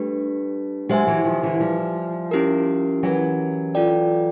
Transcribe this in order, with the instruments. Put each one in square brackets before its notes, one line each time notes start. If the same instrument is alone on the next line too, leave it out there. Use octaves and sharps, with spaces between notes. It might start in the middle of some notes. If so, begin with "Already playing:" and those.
Already playing: [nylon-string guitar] G3 A3 [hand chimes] D4 G4 B4
[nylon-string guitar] F#3 G#3 [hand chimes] G4 C5 E5 G#5
[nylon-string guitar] E3 F#3
D#3 F3
D3 E3
F3 G3
[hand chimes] C#4 E4 G4 A#4
[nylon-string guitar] E3 F#3
[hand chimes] F4 A4 D5 G5